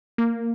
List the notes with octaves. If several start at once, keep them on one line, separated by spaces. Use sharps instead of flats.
A#3